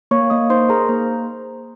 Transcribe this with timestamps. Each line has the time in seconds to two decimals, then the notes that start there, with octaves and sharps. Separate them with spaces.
0.11 A#3 C#5 C#6
0.30 A#3 D#5 D#6
0.50 D#4 C5 C6
0.69 G#4 A#4 A#5
0.89 A#3 C5